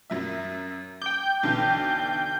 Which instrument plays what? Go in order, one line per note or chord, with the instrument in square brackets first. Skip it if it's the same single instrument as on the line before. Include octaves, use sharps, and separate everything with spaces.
[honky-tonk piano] F#2 F#3 E5
[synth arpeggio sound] G5 G6 [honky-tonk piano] D6
[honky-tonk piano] B1 D3 E3